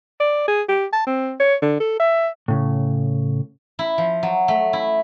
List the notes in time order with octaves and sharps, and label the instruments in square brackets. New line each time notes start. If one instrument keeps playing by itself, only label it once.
[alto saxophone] D5
G#4
G4
A5
C4
C#5
D3
A4
E5
[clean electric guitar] A2 C#3
[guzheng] E4
F3
F#3
A3
E4